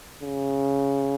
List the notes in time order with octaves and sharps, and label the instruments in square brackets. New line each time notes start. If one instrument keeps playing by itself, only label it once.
[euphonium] C#3